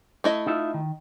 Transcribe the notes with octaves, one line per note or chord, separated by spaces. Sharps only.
A3 E4 D#5
D#4 F4 E5
D#3